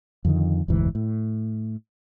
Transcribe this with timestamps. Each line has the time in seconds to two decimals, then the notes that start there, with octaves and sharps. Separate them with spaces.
0.25 F2 D3 D#3
0.68 F1 D2 G#2 E3
0.95 A2